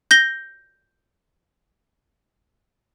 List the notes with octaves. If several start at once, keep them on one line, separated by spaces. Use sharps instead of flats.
G6 A#6 G7